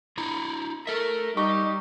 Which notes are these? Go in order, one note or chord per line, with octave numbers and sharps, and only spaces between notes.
D4 E4 A#5
A4 A#4 E5
G3 D#4 G4 C#6